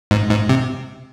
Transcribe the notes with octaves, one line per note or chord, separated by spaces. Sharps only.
G#2
G#2
C3